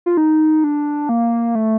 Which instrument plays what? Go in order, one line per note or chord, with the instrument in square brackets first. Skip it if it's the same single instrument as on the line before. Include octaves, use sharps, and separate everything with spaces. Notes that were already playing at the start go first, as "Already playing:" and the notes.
[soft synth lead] F4
D#4
D4
A#3
A3